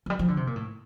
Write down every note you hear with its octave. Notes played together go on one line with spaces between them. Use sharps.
F3
G3
F3
D3
C3
A#2
A2